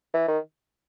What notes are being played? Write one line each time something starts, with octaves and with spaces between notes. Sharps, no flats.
E3
D#3